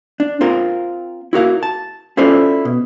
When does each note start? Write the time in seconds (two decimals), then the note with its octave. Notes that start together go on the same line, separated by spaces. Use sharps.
0.20 D4
0.41 C4 F4 A#4
1.33 E4 F#4 A#4 F5
1.63 A5
2.17 C#4 E4 F4 A4 C5 D5
2.65 B2